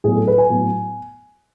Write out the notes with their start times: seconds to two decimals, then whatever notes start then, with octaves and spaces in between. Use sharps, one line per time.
0.04 A2 F#3 B3 G#4
0.15 A4
0.28 B4
0.38 G#5
0.50 A2 F#3 B3